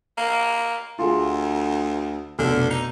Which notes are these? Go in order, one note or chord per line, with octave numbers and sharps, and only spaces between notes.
A#3
D2 F4 G#4
F1 B1 D3 F6
D#4